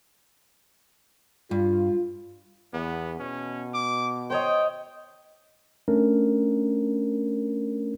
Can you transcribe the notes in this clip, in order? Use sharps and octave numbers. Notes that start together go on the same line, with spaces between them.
G2 F4
E2 B3
B2 C#4
D6
C5 C#5 D#5 G5
A3 C#4 D4 A#4